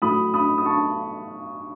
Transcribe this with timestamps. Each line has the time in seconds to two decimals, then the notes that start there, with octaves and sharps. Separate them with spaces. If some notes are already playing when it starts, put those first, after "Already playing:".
0.02 A2 F#3 B5 D#6
0.34 B5 D#6
0.58 D#6
0.65 A5 C#6